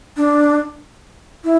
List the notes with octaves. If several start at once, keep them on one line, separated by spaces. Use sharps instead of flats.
D4
E4